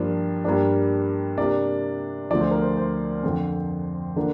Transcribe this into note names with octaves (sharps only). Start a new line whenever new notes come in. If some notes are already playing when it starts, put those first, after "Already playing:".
Already playing: G2 F3 A#3 D4
G2 G3 A#3 D4
C3 A#3 D4 D5
D2 D3 F3 D5
C5
A#4
C5
C5
F2 D3 F3 C4
D3 A#3 D4